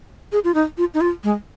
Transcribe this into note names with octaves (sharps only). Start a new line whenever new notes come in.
G#4
F4
D#4
F4
D#4
F4
G#3